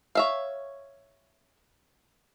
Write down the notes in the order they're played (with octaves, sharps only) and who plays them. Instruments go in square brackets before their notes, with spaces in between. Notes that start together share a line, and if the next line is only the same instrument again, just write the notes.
[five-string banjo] C#5 E5 F5